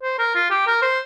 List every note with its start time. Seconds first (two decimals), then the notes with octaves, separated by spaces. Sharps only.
0.03 C5
0.19 A#4
0.35 F4
0.50 G4
0.67 A#4
0.82 C5